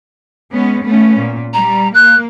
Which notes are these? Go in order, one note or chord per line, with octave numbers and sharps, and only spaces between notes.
G#3 B3 C#4
A3 B3 C#4
A#2
G3 A#5
A#3 F#6